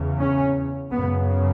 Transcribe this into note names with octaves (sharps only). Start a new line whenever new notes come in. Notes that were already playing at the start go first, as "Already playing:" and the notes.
Already playing: E2 C#3
C#4
F#2 C#3 B3